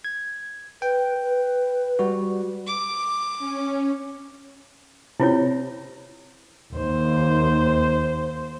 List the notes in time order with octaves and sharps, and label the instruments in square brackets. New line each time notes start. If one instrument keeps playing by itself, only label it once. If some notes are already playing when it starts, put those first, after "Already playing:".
[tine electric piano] G#6
[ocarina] B4 [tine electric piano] G5
[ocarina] B4
[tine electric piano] G3 F#4
[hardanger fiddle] D6
[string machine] C#4
[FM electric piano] C3 [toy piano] E4 F4 C#5
[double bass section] D#2 [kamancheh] C5